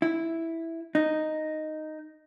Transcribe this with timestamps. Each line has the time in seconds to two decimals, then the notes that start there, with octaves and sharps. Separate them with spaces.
0.02 E4
0.95 D#4